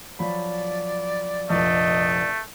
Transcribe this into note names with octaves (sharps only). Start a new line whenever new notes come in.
F3 F#3 D5 B5
F1 A#1 F2 A3 D#5